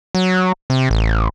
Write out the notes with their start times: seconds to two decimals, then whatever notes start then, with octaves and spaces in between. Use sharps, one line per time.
0.15 F#3
0.70 C3
0.91 A1